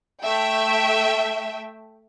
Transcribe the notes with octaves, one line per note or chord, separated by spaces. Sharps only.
A3 E5 G5